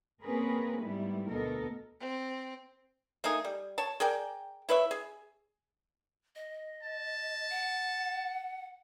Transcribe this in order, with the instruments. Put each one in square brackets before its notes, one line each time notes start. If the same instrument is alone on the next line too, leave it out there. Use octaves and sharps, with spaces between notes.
[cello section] A#3 C4 C#4 G#4 A#4 B4
G#2 G3 A3 B3 E4
D2 B2 B3 A4 A#4 D#5
[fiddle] C4
[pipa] A3 A#3 D#4 G#4
G3
C#5 A5
G#4 A#4 D5 G5
E4 B4 C#5 E5
G#4
[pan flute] D#5
[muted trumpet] A5
[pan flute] F#5